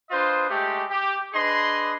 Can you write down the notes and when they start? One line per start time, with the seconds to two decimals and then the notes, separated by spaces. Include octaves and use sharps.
0.11 D4 F4 B4 C5 D#5
0.50 G#3 A3 G4
0.90 G4
1.34 D4 G#4 B4 D#5 C6